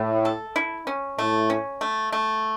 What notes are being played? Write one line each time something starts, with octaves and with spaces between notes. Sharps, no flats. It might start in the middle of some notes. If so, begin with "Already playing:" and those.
Already playing: A2 A3
A4
E4
C#4
A2 A3
C#4
A3
A3